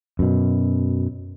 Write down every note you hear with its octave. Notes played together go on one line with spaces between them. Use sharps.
F#2 B2